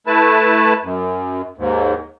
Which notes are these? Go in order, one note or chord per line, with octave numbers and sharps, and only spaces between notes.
A3 E4 B4 A5
F#2
D#2 G#2